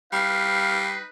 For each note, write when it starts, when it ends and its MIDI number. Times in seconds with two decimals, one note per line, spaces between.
0.13 0.98 55
0.13 1.09 63
0.13 1.09 71
0.13 0.85 77
0.13 0.97 96